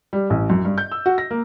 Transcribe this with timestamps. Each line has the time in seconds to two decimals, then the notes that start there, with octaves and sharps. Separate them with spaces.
0.13 G3
0.30 A1
0.50 F#2
0.65 G2
0.78 G6
0.92 E6
1.06 F#4
1.18 A#6
1.31 A#3